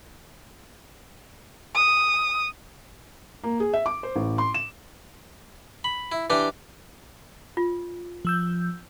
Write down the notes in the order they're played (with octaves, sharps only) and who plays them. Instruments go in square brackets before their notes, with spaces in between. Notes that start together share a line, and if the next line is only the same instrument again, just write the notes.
[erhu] D#6
[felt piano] A#3
G#4
E5
D6
C5
A1
C6
E7
[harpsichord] B5
E4
E3 D4 G4
[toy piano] F4
[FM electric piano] F3 E6 G6